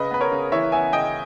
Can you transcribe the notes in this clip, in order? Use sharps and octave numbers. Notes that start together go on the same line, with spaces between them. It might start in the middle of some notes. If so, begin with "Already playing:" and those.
Already playing: C#3 B4 D#5
B3 B4
A#4 C#5
C#3
E3 C#5 E5
B3 E5 G#5
C#3 D#5 G5